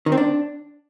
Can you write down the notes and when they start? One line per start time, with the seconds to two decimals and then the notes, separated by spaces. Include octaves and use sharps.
0.06 D#3
0.12 C4
0.18 D4